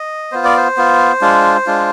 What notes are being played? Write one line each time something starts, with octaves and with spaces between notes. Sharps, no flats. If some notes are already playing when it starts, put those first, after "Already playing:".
Already playing: D#5
B3 F4 C5
D5
C5
B3 F4
G#3 D4 F4
G#3 D4 F4